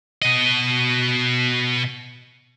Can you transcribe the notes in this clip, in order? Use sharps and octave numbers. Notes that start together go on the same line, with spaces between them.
B2 D#5